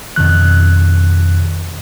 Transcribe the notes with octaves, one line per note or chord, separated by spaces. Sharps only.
F2 B2 D#3 F#6